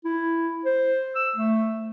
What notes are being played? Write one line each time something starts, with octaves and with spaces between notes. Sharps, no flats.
E4
C5
E6
A3